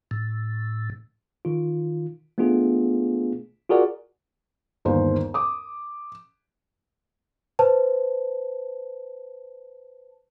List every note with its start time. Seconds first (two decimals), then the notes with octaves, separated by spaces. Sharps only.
0.11 A2
1.45 D#3 F4
2.38 A3 B3 D4 F4 G#4
3.70 F4 F#4 G#4 A#4 D5 F#5
4.85 G1 D#2 C5
5.34 D6 D#6
7.59 B4 C5 A5